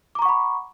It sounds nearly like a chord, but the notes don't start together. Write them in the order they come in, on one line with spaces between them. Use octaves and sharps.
D6 A#5 C#6 F#5 B5